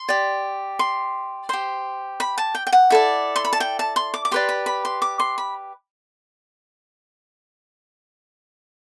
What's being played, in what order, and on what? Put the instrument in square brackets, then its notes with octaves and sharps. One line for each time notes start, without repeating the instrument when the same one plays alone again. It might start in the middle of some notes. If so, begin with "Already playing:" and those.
Already playing: [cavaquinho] C6
G4 D5
C6
G4 C5 C6
B5
A5
G5
G5
F#5
E4 A4 D5
C6
B5
A5
G5
A5
C6
D6
D6
G4 B4 D5 C6
B5
B5
C6
D6
C6
B5